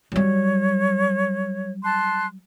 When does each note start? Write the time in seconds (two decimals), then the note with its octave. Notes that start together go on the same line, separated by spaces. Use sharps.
0.12 F#3 G3 C#5
1.84 A5 C6 F#6